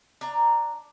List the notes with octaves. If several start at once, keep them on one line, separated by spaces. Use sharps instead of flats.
D4 A#5